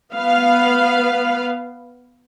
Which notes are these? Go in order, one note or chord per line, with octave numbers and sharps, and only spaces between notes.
B3 B4 F5